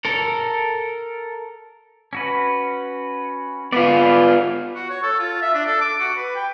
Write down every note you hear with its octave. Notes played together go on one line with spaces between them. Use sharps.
A4 A#4
C#4 F#4 B4
B3 F4 G#4 B4 D5
F#4
C#5
A4
F4
E5
D4
A4
D6
F#4
B4
G5